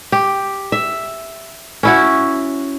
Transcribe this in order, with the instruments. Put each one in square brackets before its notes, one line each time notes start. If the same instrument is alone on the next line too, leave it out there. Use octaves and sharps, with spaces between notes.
[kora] G4
E5
C#4 E4 F#4